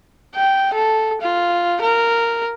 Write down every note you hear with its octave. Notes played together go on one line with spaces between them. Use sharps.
G5
A4
F4
A#4